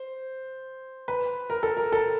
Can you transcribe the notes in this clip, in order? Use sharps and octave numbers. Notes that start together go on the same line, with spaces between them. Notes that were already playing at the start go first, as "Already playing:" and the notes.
Already playing: C5
B4
A#4
A4
A#4
A4